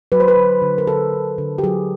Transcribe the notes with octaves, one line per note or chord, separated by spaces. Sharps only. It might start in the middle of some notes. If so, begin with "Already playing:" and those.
F#3 B4
C5
B4
D3
D3
A#4
D3 A4
D3
D3
G4
F#3 G#4